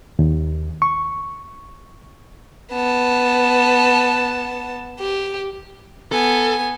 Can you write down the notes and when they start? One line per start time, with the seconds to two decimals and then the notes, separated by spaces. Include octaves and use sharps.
0.19 D#2
0.82 C#6
2.73 B3 A5
5.00 G4
6.12 B3 A4 G#5